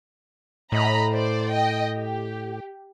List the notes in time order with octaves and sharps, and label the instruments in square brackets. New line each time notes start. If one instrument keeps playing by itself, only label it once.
[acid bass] A2 [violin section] D#5 A#5 B5
[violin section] C5 D5
D#5 G5
G4